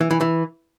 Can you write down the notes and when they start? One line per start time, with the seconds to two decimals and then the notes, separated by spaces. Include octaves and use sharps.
0.01 E3
0.11 E3
0.21 E3